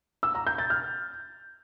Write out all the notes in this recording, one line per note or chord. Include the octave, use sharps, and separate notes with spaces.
E6
A#5
G6
A6
F6